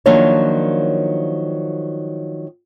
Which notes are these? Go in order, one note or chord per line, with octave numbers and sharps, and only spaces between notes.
D#3 F3 F#3 A#3 D4 C#5